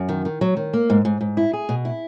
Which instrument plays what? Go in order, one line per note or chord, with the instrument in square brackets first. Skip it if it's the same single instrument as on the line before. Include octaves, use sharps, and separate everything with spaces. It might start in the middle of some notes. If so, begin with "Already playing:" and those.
Already playing: [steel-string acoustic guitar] F#2
D#3
D#3
F#3
D#3
A#3
G#2
G#2
G#2
E4
G#4
B2
E4